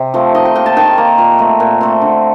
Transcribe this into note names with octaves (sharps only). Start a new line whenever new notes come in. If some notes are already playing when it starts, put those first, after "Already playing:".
Already playing: C3
F3 A3 C4
D#3 D#5
G5
A#3 G5
A5
D#3 G5
A#3
A#2
A3 C4
A#2
A3 C4
D3